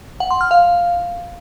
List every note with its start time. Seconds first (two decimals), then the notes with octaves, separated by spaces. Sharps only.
0.20 F#5
0.31 C6
0.41 F6
0.51 F5